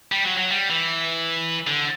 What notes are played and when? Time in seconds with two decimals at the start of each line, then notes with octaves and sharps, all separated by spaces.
0.12 G3
0.24 F#3
0.37 F#3
0.50 G3
0.70 E3
1.67 D3